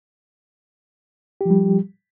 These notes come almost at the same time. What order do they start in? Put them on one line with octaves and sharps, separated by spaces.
G4 F3 G3